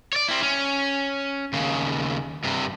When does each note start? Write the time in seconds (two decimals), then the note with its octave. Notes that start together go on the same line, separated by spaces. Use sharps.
0.13 C#5 D5
0.28 C4 E4
0.42 C#4
1.53 D#2 C#3
2.44 G2 C3